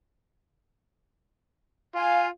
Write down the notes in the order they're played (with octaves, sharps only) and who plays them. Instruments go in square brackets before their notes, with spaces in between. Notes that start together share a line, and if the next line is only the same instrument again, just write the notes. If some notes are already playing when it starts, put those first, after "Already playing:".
[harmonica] F4 [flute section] F5 G#5